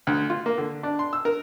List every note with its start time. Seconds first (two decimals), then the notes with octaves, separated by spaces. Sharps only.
0.07 D2
0.30 F4
0.46 A#3
0.58 D3
0.83 D4
0.99 C6
1.13 E6
1.25 A#4